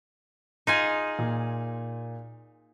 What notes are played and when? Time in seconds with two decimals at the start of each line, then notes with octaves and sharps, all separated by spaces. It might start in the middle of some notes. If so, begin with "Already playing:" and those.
0.67 D#4 F4 G#4
1.19 A#2